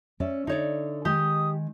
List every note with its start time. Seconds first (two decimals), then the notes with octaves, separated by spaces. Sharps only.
0.20 C#4 D5 E5
0.47 D3 D#4 C#5 D5
1.05 D#3 G#3 G4 D#6